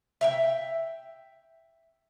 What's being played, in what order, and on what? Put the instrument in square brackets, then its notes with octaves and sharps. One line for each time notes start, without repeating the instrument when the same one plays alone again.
[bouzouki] E5 F5 G5